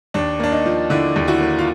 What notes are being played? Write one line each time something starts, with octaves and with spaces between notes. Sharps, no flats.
D#2 D4
A#3 D4
D#4
F3
D3 D4 E4
D#2
E4 F#4
A#3
F4